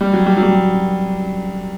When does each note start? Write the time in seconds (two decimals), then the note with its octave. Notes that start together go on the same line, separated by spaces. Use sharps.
0.01 G3
0.13 F#3
0.26 G3
0.37 F#3
0.42 G3